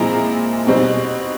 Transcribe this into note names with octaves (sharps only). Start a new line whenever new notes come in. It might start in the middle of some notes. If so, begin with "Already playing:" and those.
Already playing: A#2 F3 G#3 C4 E4 A#5
B2 G3 C4 D#4